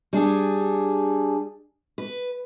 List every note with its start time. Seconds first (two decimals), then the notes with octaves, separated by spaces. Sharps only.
0.13 G3 D4 G#4
1.98 B4